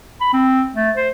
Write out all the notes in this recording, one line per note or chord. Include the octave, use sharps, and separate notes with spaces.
B5
C4
A3
C5